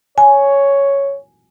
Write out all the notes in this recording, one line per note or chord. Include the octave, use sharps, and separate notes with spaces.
C#5 G#5